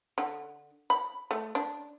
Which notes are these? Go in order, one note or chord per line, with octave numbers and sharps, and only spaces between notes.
D3
B5
A3
D4